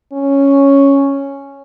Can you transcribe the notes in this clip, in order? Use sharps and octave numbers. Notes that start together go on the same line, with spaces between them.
C#4